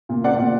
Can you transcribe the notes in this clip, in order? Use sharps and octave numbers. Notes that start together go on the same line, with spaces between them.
A#2
C4 D5 F#5
A#2